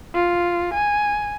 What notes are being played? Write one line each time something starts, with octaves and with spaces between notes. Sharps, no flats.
F4
G#5